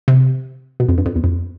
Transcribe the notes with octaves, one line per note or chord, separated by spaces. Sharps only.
C3
B2
F2
G2
F2
E2
F2